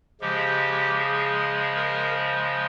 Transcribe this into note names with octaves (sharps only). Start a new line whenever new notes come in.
C#3 F3 G#3 G4
G#4
A#4